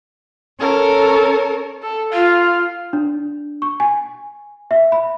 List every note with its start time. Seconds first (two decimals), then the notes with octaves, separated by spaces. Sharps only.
0.60 C#4 A4 A#4 C#5
1.83 A4
2.13 F4 F5
2.93 D4
3.62 C#6
3.80 G#5
4.71 E5
4.92 B5